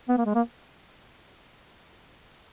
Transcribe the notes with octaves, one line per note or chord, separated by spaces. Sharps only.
B3
A#3
G#3
A#3